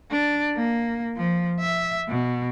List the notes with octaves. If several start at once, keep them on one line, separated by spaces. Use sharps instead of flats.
D4
A#3
F3
E5
B2